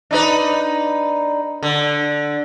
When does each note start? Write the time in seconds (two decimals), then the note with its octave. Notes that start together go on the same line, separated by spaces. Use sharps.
0.11 D4 D#4 B4
1.63 D3